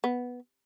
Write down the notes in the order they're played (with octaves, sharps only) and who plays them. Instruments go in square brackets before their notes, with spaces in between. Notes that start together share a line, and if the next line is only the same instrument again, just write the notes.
[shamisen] B3